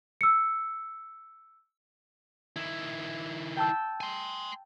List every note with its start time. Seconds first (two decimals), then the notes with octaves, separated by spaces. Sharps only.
0.21 E6 C#7
2.56 D#3 E4
3.57 G5 A5 E6
4.01 G#5 C6